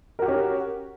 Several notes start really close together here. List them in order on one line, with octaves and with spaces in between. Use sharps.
A#4 F#4 G4 C#4